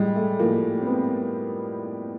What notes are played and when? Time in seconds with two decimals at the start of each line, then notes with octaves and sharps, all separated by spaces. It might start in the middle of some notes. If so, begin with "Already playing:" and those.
Already playing: A2 F3 G3 G#3
0.16 A3
0.40 A2 F3 A#3
0.81 C4
0.87 B3